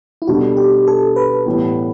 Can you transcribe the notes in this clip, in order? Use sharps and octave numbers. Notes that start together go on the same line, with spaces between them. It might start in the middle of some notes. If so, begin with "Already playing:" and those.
E4
B2 G3 D4 F#4 A4
G4
A4
B4
A2 E3 G3 B3